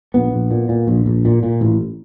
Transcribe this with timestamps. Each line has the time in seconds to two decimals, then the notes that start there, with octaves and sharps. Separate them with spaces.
0.14 A#1 B3
0.33 A#1
0.51 A#2
0.69 A#2
0.88 A#1
1.06 A#1
1.25 A#2
1.43 A#2
1.61 A1